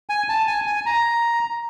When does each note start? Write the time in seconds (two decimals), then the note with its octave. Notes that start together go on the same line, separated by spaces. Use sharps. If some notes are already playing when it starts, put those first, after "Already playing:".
0.10 G#5
0.29 A5
0.47 G#5
0.67 G#5
0.86 A#5